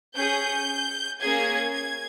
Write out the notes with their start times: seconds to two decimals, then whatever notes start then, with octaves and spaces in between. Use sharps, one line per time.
0.16 C#4 G#4 G6
1.20 A#3 C#4 G#4 G#6
1.72 G#6